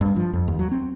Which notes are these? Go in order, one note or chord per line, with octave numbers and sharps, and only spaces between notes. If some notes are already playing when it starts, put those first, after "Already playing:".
G2
F3
F2
D#2
F#3
C4